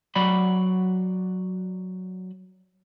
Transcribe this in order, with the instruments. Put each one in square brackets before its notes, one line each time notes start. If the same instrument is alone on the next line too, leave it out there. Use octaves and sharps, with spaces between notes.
[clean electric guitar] F#3 F#4 D5 B5